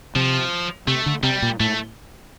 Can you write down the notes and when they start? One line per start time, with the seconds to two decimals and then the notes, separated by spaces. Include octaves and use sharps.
0.16 C3 F3
0.87 C3 A3
1.06 D3
1.23 C3 G3
1.42 A#2
1.60 A2 A3